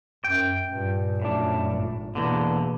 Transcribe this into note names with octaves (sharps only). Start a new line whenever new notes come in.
F#2 G5
G2 A#2
F#2 A2 F3 D4
G#1
E2 B2 D3 A#3